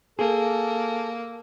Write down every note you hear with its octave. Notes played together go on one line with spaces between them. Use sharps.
A#3 G#4 A4